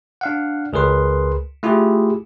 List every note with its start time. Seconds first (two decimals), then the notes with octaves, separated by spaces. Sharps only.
0.21 D4 F5 F#5
0.73 C#2 G#4 A#4 B4 C6
1.63 A3 E4 F4 G4 G#4